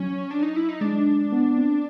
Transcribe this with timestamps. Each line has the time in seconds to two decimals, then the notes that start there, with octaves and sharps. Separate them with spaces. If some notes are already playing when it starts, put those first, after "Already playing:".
Already playing: F#3 C#4
0.31 D4
0.43 D#4
0.56 E4
0.69 D#4
0.81 G#3 D4
1.32 B3
1.58 C4